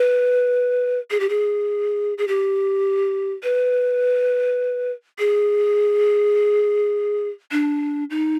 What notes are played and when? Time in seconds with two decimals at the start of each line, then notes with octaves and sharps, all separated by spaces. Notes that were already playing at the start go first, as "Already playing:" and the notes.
Already playing: B4
1.11 G#4
1.20 G4
1.29 G#4
2.18 G#4
2.28 G4
3.43 B4
5.19 G#4
7.52 D4
8.10 D#4